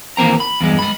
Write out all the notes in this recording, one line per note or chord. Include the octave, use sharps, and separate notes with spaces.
D#2 E3 A#3 C4 A#5
B5
E2 G2 G#3
G#3 B5